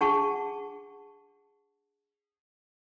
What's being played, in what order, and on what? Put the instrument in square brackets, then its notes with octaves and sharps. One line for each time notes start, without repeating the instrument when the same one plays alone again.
[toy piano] D4 G#4 F#5 A5 C#6